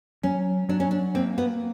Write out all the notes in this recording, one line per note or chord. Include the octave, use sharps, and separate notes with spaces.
F#3 C#4
F#3 D4
C#4
D4
A#3 C4
B3